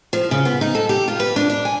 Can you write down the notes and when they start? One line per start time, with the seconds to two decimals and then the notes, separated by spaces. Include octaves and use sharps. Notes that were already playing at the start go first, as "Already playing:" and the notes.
0.13 F3
0.31 C#3
0.45 B3
0.61 D#4
0.75 A4
0.89 G4
1.08 F4
1.20 B4
1.36 D4
1.50 D4
1.65 G#5